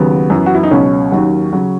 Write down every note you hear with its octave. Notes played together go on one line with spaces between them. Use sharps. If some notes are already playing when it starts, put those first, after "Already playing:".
Already playing: D#2 C#3 F#3 B3
F#2 E3
F#4
E4
D#4
C#2 B2 F#3 C#4
D#2 D#3 F#3
C#3 F#3